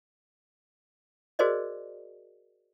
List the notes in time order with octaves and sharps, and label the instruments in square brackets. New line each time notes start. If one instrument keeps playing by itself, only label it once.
[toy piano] F#4 G#4 A#4 C5 D5 D#5